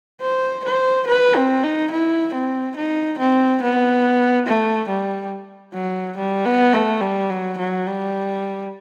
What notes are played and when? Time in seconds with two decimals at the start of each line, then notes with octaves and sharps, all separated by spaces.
0.21 C5
0.65 C5
1.07 B4
1.35 C4
1.63 D#4
1.91 E4
2.34 C4
2.77 D#4
3.19 C4
3.62 B3
4.47 A3
4.89 G3
5.74 F#3
6.17 G3
6.45 B3
6.73 A3
7.01 G3
7.30 F#3
7.58 F#3
7.87 G3